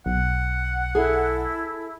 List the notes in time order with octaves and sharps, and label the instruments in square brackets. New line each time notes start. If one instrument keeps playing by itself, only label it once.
[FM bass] B1 [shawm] F#5
[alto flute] E4 [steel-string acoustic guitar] G#4 A4 E5